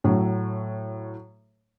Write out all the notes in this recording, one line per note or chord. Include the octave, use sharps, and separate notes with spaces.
A2 F#3